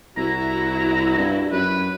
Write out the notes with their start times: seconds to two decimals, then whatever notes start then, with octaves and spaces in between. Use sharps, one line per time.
0.17 C2 E4 F#4 A#5
1.18 G2
1.52 F#2 B4